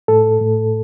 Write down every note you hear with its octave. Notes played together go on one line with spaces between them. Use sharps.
A2 A4
A2